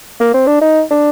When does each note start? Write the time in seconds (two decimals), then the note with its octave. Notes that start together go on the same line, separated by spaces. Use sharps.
0.20 A#3
0.34 C4
0.47 D4
0.61 D#4
0.91 D4